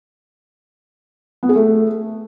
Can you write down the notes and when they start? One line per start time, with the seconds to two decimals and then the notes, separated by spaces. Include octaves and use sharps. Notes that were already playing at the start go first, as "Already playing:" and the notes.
1.43 B3
1.49 G#4
1.55 A3